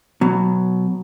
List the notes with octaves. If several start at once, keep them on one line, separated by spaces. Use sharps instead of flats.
B2 F#3